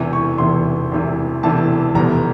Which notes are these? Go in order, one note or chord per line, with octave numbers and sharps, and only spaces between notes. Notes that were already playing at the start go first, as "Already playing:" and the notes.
Already playing: E1 E2 C3 E3
C#6
E1 E2 C3 E3 C6
E1 E2 C3 E3
E1 E2 C3 E3 A5
F1 E2 B2 G3 A#5